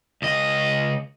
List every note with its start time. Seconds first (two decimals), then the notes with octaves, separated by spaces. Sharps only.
0.22 C#2 D#5